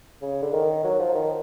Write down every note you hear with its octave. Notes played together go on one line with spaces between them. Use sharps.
C#3
D3
D#3
F#3
F3
D#3